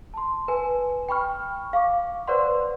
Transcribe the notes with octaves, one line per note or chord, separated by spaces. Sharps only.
A5 C6
B4 G#5
G5 B5 C#6 F6
F5 C#6 D6
B4 C5 D5 F#5 C6